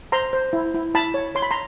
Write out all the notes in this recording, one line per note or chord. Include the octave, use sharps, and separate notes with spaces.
C5 A#5 C6
C5
E4
E4
E4 A5 B5
C#5
C#5 C6
B5
A#5 C6